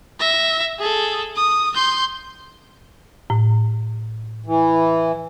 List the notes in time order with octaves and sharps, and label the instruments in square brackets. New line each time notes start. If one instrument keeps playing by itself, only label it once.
[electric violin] E5 A#6
G#4 A4
D#6
C6 G6
[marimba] A2
[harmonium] E3